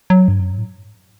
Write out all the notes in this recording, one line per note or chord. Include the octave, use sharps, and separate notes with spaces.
F#3
G2
F#2
G2
A2